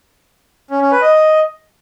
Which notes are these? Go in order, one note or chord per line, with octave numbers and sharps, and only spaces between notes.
C#4
C#4
B4
D#5